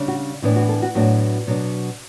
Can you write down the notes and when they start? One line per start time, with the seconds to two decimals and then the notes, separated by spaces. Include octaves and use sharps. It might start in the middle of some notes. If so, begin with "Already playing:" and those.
Already playing: C#3 G3 D4
0.08 F#4
0.42 A2 E3 B3 D4 E4
0.56 F#4
0.69 A4
0.82 F#4
0.95 A2 F#3 B3 D4 F#4
1.47 B2 F#3 B3 D4